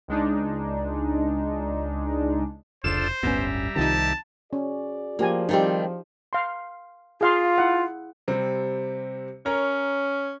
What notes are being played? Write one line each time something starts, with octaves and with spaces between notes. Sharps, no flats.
C#2 G#3 D4 D#4
F1 C#2 D4 F4 A4 C5 E7
D1 G1 G3 B3 C#4 E5 A#5
C2 C3 D#3 F3 D#4 A5
C#4 F#4 G#4 D5
F3 A#3 F4 G4 G#5
D#3 G3 C4 D#4 G4
F5 C6
F4 G#4 F5 C6
E4 F#5
C3 G3 C4
C#4 A#4 C#5 A#5